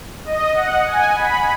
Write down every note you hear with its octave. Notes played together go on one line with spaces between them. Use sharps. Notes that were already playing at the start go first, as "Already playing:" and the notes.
D#5
F#5
G#5
B5